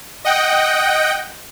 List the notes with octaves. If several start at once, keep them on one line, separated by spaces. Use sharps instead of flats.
D#5 F#5 G5